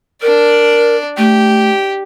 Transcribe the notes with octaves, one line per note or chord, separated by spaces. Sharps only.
D4 A#4 D5
A3 G4